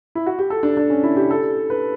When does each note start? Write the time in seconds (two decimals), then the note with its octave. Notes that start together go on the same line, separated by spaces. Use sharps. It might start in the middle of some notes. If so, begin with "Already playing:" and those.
0.15 E4
0.26 F#4
0.39 G4
0.50 A4
0.63 D4
0.77 D4
0.90 C#4
1.04 E4
1.17 G4
1.31 A4
1.70 B4